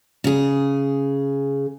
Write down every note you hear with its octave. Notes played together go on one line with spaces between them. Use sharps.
C#3 G#4